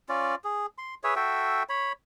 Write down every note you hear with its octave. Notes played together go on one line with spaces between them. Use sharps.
C#4 F4 D5
G#4
C6
G#4 B4 C#5 E5
F#4 A4 E5 G5
C#5 B5